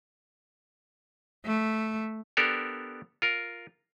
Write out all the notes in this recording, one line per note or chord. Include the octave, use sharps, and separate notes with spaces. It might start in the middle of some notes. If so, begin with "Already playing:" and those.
A3
B3 D4 G4 A4 A#4
F4 A#4